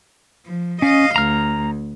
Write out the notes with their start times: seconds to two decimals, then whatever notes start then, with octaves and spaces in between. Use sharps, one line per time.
0.46 F3
0.82 C#4 D#5 F5
1.16 D2 A#5 F6